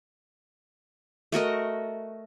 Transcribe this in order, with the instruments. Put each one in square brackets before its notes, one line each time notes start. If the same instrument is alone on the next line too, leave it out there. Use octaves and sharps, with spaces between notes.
[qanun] A3 F#4 A#4 D#5